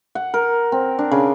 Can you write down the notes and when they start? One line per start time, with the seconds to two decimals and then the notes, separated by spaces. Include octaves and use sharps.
0.15 F#5
0.34 A#4
0.72 C4
0.99 D4
1.11 C#3